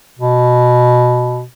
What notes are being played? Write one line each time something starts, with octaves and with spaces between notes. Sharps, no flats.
B2